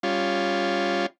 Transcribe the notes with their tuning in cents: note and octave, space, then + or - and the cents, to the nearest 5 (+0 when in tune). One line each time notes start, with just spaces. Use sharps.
G3 +15 C#4 +0 F4 +0